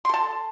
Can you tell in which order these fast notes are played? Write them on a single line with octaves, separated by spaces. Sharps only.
C6 A4 A5